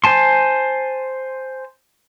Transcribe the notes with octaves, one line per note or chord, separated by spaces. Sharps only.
C5 G#5 A5 C6